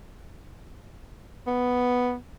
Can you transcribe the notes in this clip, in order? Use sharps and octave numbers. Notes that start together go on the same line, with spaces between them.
B3